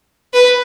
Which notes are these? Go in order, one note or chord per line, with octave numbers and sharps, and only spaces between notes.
B4